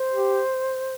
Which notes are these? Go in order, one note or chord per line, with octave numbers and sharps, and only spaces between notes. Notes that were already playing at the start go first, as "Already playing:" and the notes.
Already playing: C5
G4